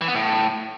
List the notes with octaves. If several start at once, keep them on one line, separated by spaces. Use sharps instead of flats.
E3
B3
A2